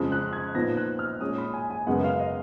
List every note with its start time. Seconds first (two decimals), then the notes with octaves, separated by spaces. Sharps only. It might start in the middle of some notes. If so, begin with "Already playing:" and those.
Already playing: F2 C#3 G#3
0.12 F#6
0.33 G#6
0.55 A#2 F3 B3 D#4 A#6
0.77 F#6
0.99 F6
1.21 A#2 G#3 C#4 D#6
1.38 B5
1.54 G#5
1.70 G#5
1.87 F#2 C#3 G#3 B3 F#5
2.04 F5
2.19 D#5